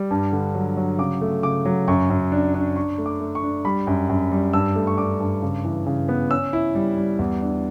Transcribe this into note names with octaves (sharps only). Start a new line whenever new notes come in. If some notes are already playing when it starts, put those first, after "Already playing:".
Already playing: G3
G2
D3
F#3
F#3
C#3 D6
A3
C#3 D6
F#3
F#2 C#6
F#2
D4
D4
D4 C#6
A3
D6
A3
C#6
D4
G3 B5
F#2
F#2
G3
G2 E6
A3
C#6
D4 D6
G2
C#3
E3
C#3
B3
C#4 E6
E4
G3
G3
E2
D4